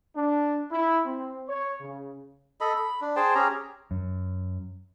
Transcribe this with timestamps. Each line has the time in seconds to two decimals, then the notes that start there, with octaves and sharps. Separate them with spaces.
0.15 D4
0.71 E4
1.05 C4
1.48 C#5
1.80 C#3
2.61 A4 D#5 B5
2.76 B5
3.01 D4
3.16 G#4 C5 G5 A5
3.35 C#4 G4 G#4 A#5
3.91 F#2